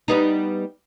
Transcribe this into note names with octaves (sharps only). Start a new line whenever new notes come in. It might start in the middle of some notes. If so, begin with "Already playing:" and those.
G3 B3 D#4